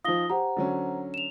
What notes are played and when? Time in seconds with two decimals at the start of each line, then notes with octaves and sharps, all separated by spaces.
0.04 F3 D#4 F4 D#6 A#6 G7
0.30 G4 C5 F#5 A#5
0.57 D3 F#3 C#4
1.14 E7 F7